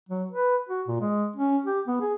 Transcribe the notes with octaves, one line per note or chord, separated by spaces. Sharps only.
F#3
B4
F#4
A#2
G#3
C#4
G4
B3
G#4